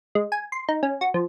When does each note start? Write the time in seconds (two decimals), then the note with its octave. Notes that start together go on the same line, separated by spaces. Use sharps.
0.15 G#3
0.32 G#5
0.52 C6
0.69 D#4
0.83 C#4
1.01 F#4
1.14 F3